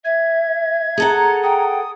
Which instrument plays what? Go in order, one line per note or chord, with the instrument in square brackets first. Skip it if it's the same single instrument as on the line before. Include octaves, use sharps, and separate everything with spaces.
[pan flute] E5 [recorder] G#6
[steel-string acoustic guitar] G#4 A4 F#5 [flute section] A#5
[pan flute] G5 [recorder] D#6